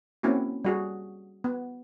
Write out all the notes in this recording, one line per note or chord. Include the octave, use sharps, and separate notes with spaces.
A#3 C4 C#4 E4 F#4
G3 F#4 G#4
B3